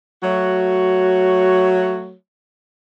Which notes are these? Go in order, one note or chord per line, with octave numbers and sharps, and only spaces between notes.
F#3 A3 F#4 C#5